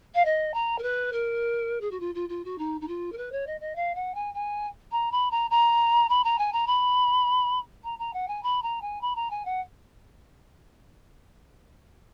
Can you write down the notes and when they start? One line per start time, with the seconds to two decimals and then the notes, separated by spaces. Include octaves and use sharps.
0.14 F5
0.25 D#5
0.54 A#5
0.78 A#4
0.82 B4
1.12 A#4
1.80 G#4
1.91 F#4
2.00 F4
2.15 F4
2.29 F4
2.44 F#4
2.58 D#4
2.81 D#4
2.88 F4
3.12 A#4
3.17 B4
3.32 C#5
3.46 D#5
3.60 D#5
3.75 F5
3.95 F#5
4.14 G#5
4.34 G#5
4.91 A#5
5.11 B5
5.31 A#5
5.50 A#5
6.09 B5
6.24 A#5
6.38 G#5
6.52 A#5
6.67 B5
7.84 A#5
7.99 A#5
8.13 F#5
8.28 G#5
8.43 B5
8.62 A#5
8.81 G#5
9.01 B5
9.15 A#5
9.30 G#5
9.45 F#5